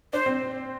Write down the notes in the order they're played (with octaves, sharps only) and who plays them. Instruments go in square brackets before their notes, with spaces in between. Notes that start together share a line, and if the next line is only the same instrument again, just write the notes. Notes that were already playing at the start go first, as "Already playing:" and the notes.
[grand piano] D4 [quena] C5
[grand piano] C4